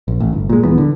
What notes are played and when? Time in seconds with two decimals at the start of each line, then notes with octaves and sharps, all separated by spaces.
0.08 A#1
0.20 A1
0.33 G1
0.49 A#2 G#3
0.64 D#1 E3 B3
0.78 D3